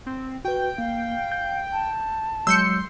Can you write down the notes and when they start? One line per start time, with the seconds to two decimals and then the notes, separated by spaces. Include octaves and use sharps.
0.06 C4
0.45 F#4 B4 G5
0.78 A#3 F5
1.32 G6
1.73 A5
2.47 F#3 G#3 C6 E6 G6 C#7